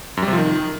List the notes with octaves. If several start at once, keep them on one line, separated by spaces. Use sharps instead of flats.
F#2
G3
C3
F3
D#3